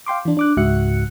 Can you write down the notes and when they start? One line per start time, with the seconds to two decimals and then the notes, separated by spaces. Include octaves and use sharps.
0.06 F5 G5 C6 D6
0.25 E3 D4
0.37 D4 D6 F#6
0.57 C#2 G#2 F#4 E5 F#6 C#7